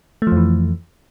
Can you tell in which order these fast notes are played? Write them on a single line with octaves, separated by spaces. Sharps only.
A3 F3 F2 E3